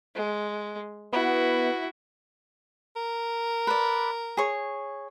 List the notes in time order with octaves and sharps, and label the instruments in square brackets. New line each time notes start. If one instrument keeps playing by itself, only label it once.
[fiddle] G#3
[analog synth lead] B3 [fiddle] E4 F#4
[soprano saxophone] A#4
[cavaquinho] B4 D5
G#4 C#5